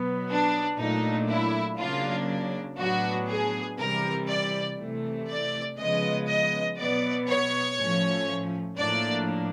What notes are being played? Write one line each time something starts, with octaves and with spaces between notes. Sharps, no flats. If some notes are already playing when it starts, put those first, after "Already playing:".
Already playing: B2 F#3 B3
D4
A#2 F#3 A3 D4 D#4
E4
C#3 F#3 A#3 D4 F4
A2 F#3 B3 D4 F#4
G#4
C3 E3 G3 A#4
D5
C3 E3 A3
D5
C#3 F3 G#3 B3 D#5
D#5
B2 F#3 B3 D5
C#5
A2 F3 A3 C#4
A2 F3 A#3 D4 D5